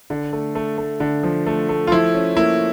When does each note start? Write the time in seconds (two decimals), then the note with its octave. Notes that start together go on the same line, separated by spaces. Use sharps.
0.10 D3
0.33 A3
0.55 A3
0.78 A3
1.00 D3
1.23 F3
1.46 A3
1.69 A3
1.87 F4
1.91 F3 E4
2.14 C#4
2.37 A#3 E4